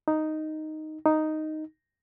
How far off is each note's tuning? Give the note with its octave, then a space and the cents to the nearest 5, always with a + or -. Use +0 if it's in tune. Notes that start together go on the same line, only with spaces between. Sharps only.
D#4 +0
D#4 +0